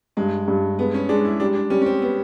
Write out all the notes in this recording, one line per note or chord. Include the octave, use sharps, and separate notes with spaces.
G2 G#3
G2
G#3 B3
C#4
G#3 D4
E4
G3 D4
D4
G3 C#4
C#4
C4
B3